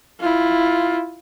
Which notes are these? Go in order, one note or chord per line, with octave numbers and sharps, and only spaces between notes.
E4 F4